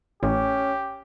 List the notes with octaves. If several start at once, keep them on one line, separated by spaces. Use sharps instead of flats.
A1 C#4 G4